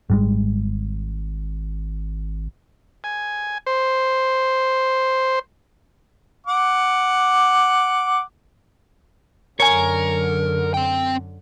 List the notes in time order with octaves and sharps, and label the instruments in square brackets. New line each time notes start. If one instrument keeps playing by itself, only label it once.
[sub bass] G#1 [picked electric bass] G#2 G3 G#3
[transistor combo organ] G#5
C5
[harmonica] F#5 D6
[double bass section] F#2 D3 [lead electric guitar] A#4 [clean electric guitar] C#5 G#5
[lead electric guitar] C4 G5